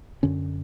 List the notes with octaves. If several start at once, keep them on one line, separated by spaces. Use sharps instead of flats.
F#2 D3 C#4